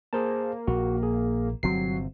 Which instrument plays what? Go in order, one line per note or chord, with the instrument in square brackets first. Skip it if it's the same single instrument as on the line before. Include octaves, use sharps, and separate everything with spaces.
[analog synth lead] A#3 [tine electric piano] G#4 C5 A5
[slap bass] A#1 [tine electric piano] F#4
[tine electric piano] G#4
[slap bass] G1 C3 C4 [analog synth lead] F#3 [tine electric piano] C7